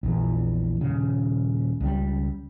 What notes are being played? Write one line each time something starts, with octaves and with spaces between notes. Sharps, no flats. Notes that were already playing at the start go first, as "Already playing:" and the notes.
A#1 E2
D#1 C#3
C#2 G3